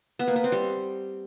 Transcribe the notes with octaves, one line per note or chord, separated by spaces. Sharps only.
B3
A#3
B3
C4
G3